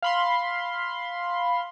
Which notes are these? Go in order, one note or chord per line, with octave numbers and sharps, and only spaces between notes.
F5 B5 C6